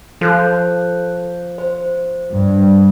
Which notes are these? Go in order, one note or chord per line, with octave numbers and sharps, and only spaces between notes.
F3 A4 F#6 G6
C5
G2